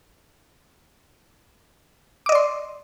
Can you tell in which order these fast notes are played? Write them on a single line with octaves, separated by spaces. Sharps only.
D6 D#5 D5 C6